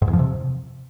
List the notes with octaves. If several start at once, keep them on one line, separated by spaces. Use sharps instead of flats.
G#2
E2
F3
C3